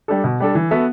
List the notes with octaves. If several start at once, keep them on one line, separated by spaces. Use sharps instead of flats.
G3 D4 A4
B2
G3 D4 A4
E3
B3 F#4 A4 E5